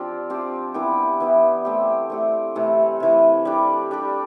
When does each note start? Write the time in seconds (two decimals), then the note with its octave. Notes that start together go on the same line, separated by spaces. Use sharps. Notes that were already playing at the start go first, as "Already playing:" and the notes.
Already playing: F3 C4 D4 F4 G4
0.30 F3 C4 G4
0.74 E3 B3 E4 G4
1.20 E3 B3 E4 G4
1.65 A3 C4 G4
2.10 A3 C4 G4
2.55 C3 E3 A3
3.00 C3 E3 A3
3.45 G3 D4 G4
3.91 G3 D4 G4